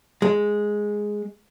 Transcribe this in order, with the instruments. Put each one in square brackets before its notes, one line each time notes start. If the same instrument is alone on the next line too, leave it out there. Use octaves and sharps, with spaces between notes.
[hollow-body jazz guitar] G#3